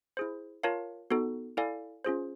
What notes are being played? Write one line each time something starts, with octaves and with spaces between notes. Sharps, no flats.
E4 G#4 C5
F4 A#4 C#5 F5 A5
B3 D#4 F#4 A4
E4 A4 D5 F5 G#5
C#4 F4 G#4 C5